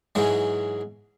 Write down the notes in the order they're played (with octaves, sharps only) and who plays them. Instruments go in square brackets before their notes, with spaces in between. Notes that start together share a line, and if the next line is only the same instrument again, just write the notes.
[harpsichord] G#2 E3 F#3 G#3